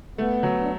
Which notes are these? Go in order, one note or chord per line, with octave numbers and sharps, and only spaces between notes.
A3 B3
F#3
D4